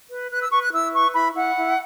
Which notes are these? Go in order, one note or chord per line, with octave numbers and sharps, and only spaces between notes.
B4
B4 F#6
E6
B4 C#6
F#6
E4 E6
B4 C#6
E4 B5
E4 F#5
E4